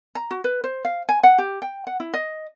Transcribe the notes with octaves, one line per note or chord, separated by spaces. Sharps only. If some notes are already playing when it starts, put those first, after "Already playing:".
A#5
F#4
B4
C5
F5
G#5
F#5
G4
G5
F#5
E4
D#5